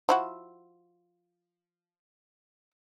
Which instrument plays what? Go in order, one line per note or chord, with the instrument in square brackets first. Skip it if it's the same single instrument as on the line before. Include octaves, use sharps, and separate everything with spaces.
[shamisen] F3 E4 F#4